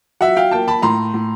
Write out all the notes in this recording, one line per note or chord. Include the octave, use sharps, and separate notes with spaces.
F#3 E5 F#5
F5 G5
A#3 G5 A5
A5 B5
A2 A#5 C6
A2